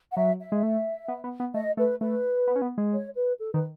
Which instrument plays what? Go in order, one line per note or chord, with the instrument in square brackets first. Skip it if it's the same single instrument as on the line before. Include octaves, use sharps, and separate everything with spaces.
[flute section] F#5
[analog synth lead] F#3 [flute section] E5
[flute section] E5
[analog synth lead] G#3
A3
B3
B3
B3
[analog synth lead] A3 [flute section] D#5
[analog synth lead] A3 [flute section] B4
[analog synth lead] A3 [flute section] B4
[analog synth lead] B3
C#4
B3
G#3
[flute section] C#5
B4
A4
[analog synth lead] D#3 [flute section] B4